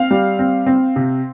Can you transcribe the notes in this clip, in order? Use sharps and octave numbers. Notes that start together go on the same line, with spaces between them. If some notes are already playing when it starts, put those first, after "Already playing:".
Already playing: C4 F5
G3
C4
C4
C3